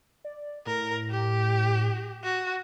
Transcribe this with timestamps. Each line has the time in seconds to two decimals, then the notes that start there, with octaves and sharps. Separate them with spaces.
0.25 D5
0.66 A2 A#4
1.10 G4
2.24 F#4